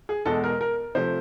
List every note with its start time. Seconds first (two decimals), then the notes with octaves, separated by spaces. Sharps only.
0.09 G#4
0.25 E2 B2 G#3 A4
0.44 A#4
0.61 A#4
0.95 C3 F3 A3 C5